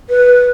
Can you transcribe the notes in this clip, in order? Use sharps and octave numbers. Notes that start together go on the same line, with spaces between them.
B4